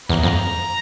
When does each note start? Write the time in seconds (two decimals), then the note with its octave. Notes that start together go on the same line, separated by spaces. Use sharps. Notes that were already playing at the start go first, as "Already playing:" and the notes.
0.09 E2 A#5
0.23 F2